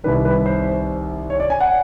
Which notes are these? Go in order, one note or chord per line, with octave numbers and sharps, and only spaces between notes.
C2 C3 D#3 G3 B4
B4
C5
C#5
D5
G#5
F#5